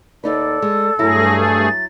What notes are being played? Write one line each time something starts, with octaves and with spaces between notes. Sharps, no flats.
D#2 D#4 A4 B4 D5
G#3
G2 F#3 A3 E4 G#4 A#6
A6